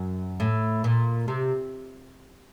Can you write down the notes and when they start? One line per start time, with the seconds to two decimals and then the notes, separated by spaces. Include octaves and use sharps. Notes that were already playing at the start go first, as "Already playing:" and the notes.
Already playing: F#2
0.40 A2
0.84 A#2
1.28 C3